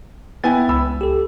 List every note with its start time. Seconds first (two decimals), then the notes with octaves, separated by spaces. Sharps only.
0.44 B3 E4 B4 G5 G#5 A6
0.69 C#2 B5 E6
1.01 G4 A4